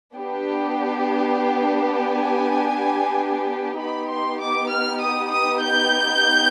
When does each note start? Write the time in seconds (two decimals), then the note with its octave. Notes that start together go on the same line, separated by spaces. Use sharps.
0.15 B3 D4 G4
1.97 G#5
3.79 B3 D#4 G4 B5
4.10 C6
4.41 D6
4.71 F6
5.01 D#6
5.32 D#6
5.63 G6